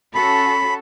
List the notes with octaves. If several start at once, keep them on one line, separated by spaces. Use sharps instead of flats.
C#4 F#4 A4 B5